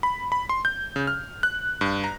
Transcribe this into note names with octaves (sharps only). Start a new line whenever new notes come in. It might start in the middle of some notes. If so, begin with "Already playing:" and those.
B5
B5
C6
G6
C#3
F6
F#6
G2
A#5